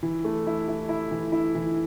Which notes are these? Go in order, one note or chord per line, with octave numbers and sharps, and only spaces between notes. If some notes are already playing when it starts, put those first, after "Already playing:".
E3
A3
E4
E4
E4
E3
E4
E3